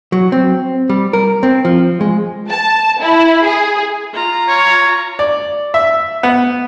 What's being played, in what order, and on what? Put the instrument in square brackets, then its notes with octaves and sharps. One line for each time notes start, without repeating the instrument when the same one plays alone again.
[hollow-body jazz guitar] F#3
C4
G3
A#4
C4
F3
G#3
[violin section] A5
E4
G#4
[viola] F4 A#5
[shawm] C#5
[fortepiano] D5
E5
B3